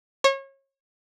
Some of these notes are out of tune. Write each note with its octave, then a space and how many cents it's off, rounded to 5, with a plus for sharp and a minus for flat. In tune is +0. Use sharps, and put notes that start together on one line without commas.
C#5 -30